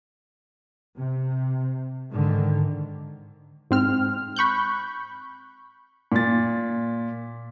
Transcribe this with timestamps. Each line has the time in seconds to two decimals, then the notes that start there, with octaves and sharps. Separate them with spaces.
0.98 C3
2.10 G#2 D3 D#3
3.71 G#2 C4 F6
4.36 B5 C#6 F#6 G6
6.12 A#2 A6